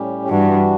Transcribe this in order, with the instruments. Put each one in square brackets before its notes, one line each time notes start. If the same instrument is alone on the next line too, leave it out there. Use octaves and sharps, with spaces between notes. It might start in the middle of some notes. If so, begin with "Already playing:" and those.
Already playing: [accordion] A2 G3 C#4 G4
[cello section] G2 [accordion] E3 G3 D4 F#4